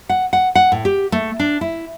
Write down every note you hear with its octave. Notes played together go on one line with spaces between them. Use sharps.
F#5
F#5
F#5
A2
G4
A3
D4
E4